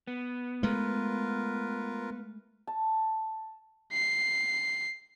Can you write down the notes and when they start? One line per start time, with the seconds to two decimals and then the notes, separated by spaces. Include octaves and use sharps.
0.07 B3
0.63 G#3 A3 F4 A#4 B4
2.67 A5
3.93 C7